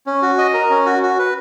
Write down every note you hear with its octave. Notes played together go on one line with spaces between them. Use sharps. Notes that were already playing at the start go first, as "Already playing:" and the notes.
C#4
F#4
D#5
A#4
C#4
F#4
F#4
B4